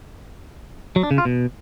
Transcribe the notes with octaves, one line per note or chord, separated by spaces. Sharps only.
F#3
D4
C#3
F4
B2